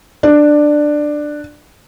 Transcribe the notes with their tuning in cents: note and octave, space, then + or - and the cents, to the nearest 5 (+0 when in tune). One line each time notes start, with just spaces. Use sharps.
D4 +10